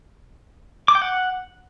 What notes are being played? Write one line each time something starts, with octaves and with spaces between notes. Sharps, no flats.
D6
G5
F#5